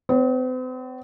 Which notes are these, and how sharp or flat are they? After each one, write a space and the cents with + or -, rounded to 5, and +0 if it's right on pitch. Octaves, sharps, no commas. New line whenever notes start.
C4 -45 C#5 +0